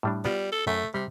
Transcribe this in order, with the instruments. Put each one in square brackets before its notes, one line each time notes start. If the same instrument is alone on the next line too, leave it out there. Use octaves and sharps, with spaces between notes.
[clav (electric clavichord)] A2 G3 D4
[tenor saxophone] G3 [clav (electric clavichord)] B3 F4 F#4
[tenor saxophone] A4
[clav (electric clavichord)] F#2 [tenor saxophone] A3
[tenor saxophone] C3 [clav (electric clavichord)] G3